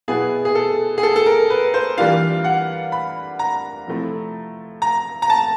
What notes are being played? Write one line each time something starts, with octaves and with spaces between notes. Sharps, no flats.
B2 F#3 B3 E4 G#4
G#4
A4
G#4
A4
A4
A#4
B4
C5
E3 G3 A#3 D4 F4 F5
F#5
B5
A#5
C3 F3 A3 C4 E4
A#5
A#5
A5